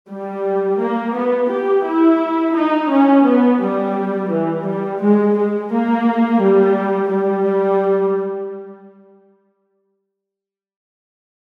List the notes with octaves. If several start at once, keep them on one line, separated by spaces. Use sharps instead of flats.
G3
A#3
B3
G4
E4
D#4
C#4
B3
G3
E3
G3
G#3
G#3
A#3
G3
G3